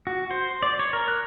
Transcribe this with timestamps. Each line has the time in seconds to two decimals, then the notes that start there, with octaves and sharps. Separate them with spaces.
0.07 F#4
0.31 C5
0.63 D5
0.79 C#5
0.93 A#4
1.08 F#6